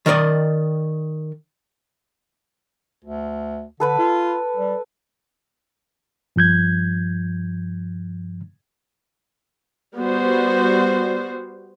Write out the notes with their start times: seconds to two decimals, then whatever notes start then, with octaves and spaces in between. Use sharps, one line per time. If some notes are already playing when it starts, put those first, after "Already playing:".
0.06 D#3 A#4 B4 D5 D#5
3.04 D2
3.80 D3 A4 B4 B5
3.98 F4
4.56 G3
6.36 G2 F3 G6 G#6
9.97 G3 B3 F#4 C5